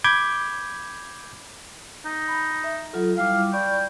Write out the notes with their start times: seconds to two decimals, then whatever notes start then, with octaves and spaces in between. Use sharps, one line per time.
0.05 B5 D6 G6 G#6
2.05 D#4
2.28 B5
2.64 E5
2.93 F#3 F4 A4
3.18 G3 E4 F5 D6
3.53 D5 G5 B5 C#6